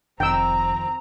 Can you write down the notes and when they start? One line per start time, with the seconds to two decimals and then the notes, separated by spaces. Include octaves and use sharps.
0.20 F1 F2 D#3 C4 G5 A#5 E6